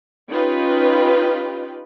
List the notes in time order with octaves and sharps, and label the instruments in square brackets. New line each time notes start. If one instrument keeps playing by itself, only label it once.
[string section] C#4 D#4 F4 G4 B4